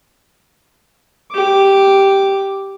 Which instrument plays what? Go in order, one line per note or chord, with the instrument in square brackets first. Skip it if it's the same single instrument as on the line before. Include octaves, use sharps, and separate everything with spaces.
[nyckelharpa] G4 D6